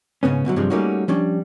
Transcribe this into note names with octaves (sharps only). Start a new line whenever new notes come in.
G#2 C#3 B3 C#4
D2 B2 F3 F#3
G2 C3 F3 G3 G#3
G3 A3 A#3 C#4 D#4 F#4
F3 G3 C#4 D4